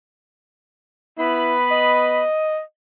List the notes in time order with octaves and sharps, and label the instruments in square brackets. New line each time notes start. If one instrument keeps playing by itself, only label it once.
[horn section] B3 B4 B5 [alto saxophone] E4
[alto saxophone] D#5